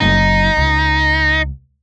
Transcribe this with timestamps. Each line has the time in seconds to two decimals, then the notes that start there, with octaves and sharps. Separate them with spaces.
0.01 F#1 F#3 D#4
0.57 C#2